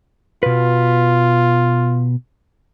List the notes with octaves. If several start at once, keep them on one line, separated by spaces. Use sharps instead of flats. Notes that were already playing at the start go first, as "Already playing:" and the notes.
B2 F4 B4